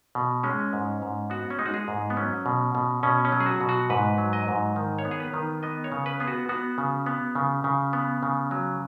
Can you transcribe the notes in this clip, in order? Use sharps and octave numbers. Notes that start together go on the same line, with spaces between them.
B2
G#3 C#4
G#2
G#2
B3 F#4
C#4
G#3 D#4
F#4
G#4
G#2
B3
F#3 C#4
B2
B2
B2 C#4
C#4
F#3
G#4
F#4
B2
F#4
G#2 B4
F#3
D#5
G#2
D#3
C#5
B3
G#4
B4
D#3
B3 D#5
C#5
C#3
B4
B3 G#4
F#4
B3 F#4
C#3
B3
C#3
C#3
B3
C#3
F#3